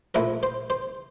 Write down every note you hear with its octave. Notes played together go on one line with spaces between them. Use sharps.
A#2 F3 A3 E4 A#4
C5
C5